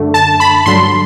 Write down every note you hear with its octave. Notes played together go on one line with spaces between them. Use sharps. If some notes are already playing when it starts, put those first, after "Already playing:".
Already playing: F#2 D3 A3
A5
B5
G2 D3 F#3 C6